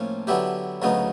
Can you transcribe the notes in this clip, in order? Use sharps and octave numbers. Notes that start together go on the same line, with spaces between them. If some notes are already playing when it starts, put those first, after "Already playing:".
Already playing: A2 F3 A#3 C#4
D3 F#3 B3 E4 G4
D2 C#3 F#3 B3 D#4